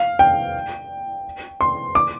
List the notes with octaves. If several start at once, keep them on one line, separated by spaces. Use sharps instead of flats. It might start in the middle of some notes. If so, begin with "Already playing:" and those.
Already playing: F5
G5
C6
D6